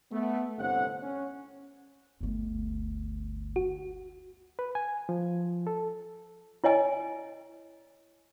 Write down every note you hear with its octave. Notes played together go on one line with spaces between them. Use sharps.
A3 B3
G1 A2 C3 C4 C5 F#5
C#4
G1 D2
F#4
B4
G#5
F3
A4
E4 C#5 D#5 G#5